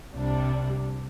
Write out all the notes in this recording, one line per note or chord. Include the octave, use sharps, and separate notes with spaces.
C2 C3 G3 D4